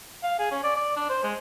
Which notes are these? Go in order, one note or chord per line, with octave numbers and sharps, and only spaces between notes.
F5
G#4
C#4
D5
D5
D4
C5
G#3